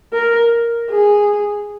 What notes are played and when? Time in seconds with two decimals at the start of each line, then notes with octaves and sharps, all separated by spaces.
0.13 A#4
0.91 G#4